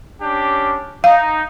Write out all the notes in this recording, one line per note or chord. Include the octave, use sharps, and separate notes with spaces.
C#4 D4 G4
D#4 F5